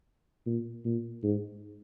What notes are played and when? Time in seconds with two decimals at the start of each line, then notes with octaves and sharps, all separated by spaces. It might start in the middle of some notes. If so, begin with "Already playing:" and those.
0.46 A#2
0.85 A#2
1.23 G#2